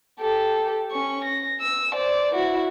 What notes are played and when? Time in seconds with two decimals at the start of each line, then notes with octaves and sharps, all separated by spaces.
0.20 G4 A4
0.91 C#4 C#6
1.25 A#6
1.60 E6
1.94 C5 D5
2.34 E4 F#4